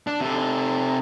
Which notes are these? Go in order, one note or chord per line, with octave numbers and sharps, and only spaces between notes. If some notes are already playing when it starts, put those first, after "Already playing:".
D4
C3 A4